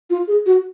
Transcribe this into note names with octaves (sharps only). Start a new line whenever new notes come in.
F4
G#4
F#4